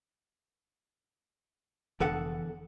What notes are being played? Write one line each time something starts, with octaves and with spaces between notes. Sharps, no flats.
F1 E2 D3 A4 F#5